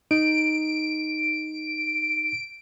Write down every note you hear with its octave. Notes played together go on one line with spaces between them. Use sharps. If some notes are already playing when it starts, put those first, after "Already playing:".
D#4 D7